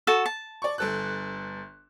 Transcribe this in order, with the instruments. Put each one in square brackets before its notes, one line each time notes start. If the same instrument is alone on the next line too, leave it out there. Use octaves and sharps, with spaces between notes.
[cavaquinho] F#4 A4 A5
A5
[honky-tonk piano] D5 C#6
G1 A4 F#6